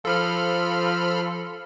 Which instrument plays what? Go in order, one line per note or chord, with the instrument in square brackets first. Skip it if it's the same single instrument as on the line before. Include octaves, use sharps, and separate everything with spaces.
[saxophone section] F3 [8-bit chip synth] A4 B5 F6